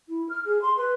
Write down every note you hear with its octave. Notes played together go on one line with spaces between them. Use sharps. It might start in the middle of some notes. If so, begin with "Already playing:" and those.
E4
F6
G#4
C6
B4